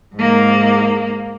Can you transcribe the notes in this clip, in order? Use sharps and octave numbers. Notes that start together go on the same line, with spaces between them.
G#2 A#3